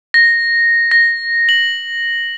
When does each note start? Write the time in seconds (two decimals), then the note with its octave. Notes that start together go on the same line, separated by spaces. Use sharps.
0.14 A#6
0.91 A#6
1.49 F#7